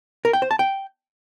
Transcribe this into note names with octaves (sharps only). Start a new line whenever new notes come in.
A#4
G5
C5
A5
G5